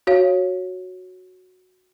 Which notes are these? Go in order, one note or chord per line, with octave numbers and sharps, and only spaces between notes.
F#4 C#5 F5